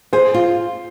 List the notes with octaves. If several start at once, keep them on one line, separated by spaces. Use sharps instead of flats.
G#4 C5
F4